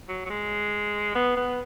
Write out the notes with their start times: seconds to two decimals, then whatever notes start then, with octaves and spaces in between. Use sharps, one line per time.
0.09 F#3
0.26 F#3
0.30 G#3
1.15 B3
1.37 B3